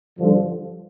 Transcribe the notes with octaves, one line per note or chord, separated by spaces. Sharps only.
G2 D3 F3